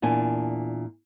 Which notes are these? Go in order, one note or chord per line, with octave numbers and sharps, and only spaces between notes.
E2 A#2 D4 G#5